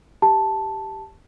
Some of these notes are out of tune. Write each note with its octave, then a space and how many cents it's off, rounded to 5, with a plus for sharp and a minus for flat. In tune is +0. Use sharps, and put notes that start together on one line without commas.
G4 +0 A5 +0